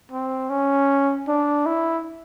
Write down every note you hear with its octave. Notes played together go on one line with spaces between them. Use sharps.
C4
C#4
D4
E4